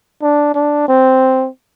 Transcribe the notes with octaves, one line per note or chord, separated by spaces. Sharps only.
D4
D4
C4